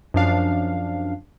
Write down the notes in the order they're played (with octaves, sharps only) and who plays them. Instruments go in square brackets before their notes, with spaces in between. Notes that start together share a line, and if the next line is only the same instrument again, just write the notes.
[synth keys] F#2 F3 D4 F5